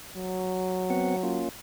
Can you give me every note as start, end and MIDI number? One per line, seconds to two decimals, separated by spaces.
0.17 1.41 54
0.90 1.16 59
0.90 1.16 60
0.90 1.16 78
1.23 1.49 58
1.23 1.49 61
1.23 1.49 65